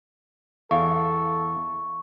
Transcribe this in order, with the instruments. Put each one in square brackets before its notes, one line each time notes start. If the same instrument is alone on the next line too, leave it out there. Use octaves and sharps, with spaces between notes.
[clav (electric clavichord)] E2 [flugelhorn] A4 [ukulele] F5 [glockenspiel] C#6